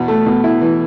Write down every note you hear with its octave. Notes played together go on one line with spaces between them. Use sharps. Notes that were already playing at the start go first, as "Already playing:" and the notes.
Already playing: E2 B2
A3
B2
E4
E3